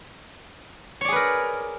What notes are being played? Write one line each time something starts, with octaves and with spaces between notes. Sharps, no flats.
G#4 A#4 B4 C#5 D5